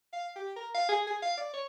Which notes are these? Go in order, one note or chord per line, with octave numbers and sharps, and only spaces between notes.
F5
G4
A#4
F5
G#4
G#4
F5
D5
C#5